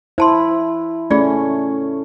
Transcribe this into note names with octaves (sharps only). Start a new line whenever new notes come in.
E4 C5 A5 C6
A3 C#4 F4 G#4 D5